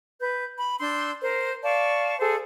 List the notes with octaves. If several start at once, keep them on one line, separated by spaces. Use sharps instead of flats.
B4 G6
B5
D4 C6 E6 G6
A#4 C5
D5 F5 A5 C#6
G#4 A4 C5